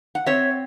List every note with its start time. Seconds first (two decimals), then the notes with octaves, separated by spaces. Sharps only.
0.15 F#5
0.26 C4 C#5 E5